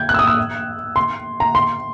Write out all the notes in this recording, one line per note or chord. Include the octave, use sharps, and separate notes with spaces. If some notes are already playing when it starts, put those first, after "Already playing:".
Already playing: G6 G#6
F#6
E6
D#6
E6
C6
A#5
C6